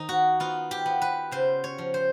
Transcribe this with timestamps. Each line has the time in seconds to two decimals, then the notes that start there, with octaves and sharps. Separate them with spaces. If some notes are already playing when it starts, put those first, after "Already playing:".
Already playing: D#3 D#4
0.09 F#4
0.40 B3 F4
0.71 G4
0.86 B3
1.02 B4
1.32 C#3 C5
1.64 C#5
1.78 F3
1.94 C5